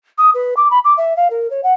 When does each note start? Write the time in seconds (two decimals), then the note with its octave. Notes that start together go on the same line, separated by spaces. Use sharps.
0.18 D#6
0.34 B4
0.57 D6
0.71 B5
0.85 D6
0.98 E5
1.16 F5
1.30 A#4
1.50 C#5
1.63 F#5